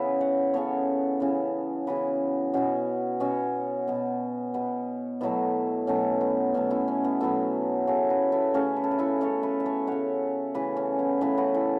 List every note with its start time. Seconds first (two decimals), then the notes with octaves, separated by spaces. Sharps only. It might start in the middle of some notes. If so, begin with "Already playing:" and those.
Already playing: C#3 E3 B3 B4 E5
0.21 C#5 F#5
0.54 C#3 E3 B3 A4 C#5
1.20 C#3 E3 B3
1.87 C#3 E3 B3 F#4 B4
2.54 B2 B3 C#4 F#4
3.20 B2 B3 C#4 F#4
3.88 B2 B3
4.54 B2 B3
5.21 B2 F#3 A3 B3 E4
5.87 B2 F#3 A3 C#4
6.21 B3
6.54 B2 F#3 A3 C#4
6.70 B3 E4
6.88 C#4
7.04 B3
7.20 B2 F#3 A3 B3 E4
7.87 C#3 A3 C#4 F#4
8.10 F#4 B4
8.32 E4 A4
8.54 C#3 A3 C#4 F#4
8.76 B4
8.84 A4
8.91 F#4 B4
8.99 E4 A4
9.21 C#3 A3 A4 C#5
9.43 B4 E5
9.60 E5
9.66 A4 C#5
9.87 C#3 A3 C#5 F#5
10.54 C#3 E3 A3 B4 E5
10.77 C#4
10.99 B3 E4
11.21 C#3 E3 A3 B4 E5
11.37 F#4 B4
11.54 E4 A4